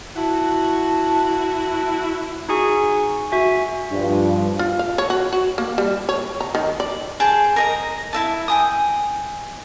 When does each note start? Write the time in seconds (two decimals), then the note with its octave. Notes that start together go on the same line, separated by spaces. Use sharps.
0.16 E4 F#4 A5
2.49 D#4 F#4 G#4 G#5 C#6
3.32 F#4 E5 G#5
3.92 G2 F3
4.59 F4
4.79 F5
4.98 C#5
5.10 F#4
5.33 F#4
5.58 A#3
5.78 G3
6.09 C#5
6.41 A#5
6.55 D#3
6.80 D5
7.20 G#4 C5 G5 A5
7.56 A#4 D#5 A#5
8.13 E4 E5 A5
8.48 G5 G#5 D#6